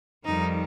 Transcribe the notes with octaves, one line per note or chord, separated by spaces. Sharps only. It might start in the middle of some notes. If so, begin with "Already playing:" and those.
F2 D#3 G3 D#4